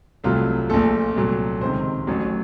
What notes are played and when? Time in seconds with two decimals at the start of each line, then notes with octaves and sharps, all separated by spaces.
0.24 C2 C3 F#3 A3 F4
0.69 A#1 A#2 A3 A4
1.16 C2 A#2 F#3 A3
1.61 C#2 C3 D#3 C5
2.07 A1 A2 F#3